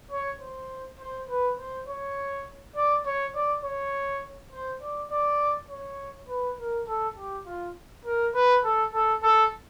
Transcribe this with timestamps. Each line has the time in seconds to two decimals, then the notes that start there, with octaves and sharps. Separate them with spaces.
0.12 C#5
0.41 C5
1.00 C5
1.29 B4
1.58 C5
1.88 C#5
2.76 D5
3.06 C#5
3.35 D5
3.64 C#5
4.52 C5
4.82 D5
5.11 D5
5.70 C#5
6.29 B4
6.58 A#4
6.87 A4
7.17 G4
7.46 F4
8.05 A#4
8.35 B4
8.64 A4
8.93 A4
9.23 A4